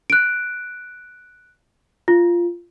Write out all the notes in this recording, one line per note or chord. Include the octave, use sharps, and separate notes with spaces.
F#6 D7
F4